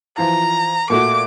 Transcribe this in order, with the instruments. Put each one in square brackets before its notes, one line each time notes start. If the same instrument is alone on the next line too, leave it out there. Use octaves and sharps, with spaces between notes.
[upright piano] E3 F3 F4 [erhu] A#5
[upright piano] A#2 A3 F#4 [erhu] D6